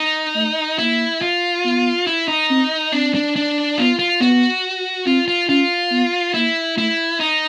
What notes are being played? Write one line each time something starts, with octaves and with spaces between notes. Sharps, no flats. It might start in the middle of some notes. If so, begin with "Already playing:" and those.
Already playing: D#4
A3
A#3 E4
F4
B3
E4
D#4
C4
C4 D4
D4
D4
B3 F4
F4
B3 F#4
C4 F4
F4
C#4 F4
B3
A#3 E4
A3 E4
D#4